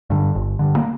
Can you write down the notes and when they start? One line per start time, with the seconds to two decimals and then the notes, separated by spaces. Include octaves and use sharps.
0.10 G2 D3
0.35 G1
0.59 G2 D3
0.76 A#3